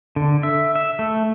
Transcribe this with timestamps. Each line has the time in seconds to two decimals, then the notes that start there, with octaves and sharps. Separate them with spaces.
0.16 D3
0.43 E5
0.76 E5
0.99 A3